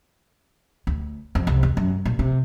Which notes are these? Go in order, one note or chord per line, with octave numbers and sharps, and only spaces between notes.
D2
F2
C2
E2
F#2
A#2
C3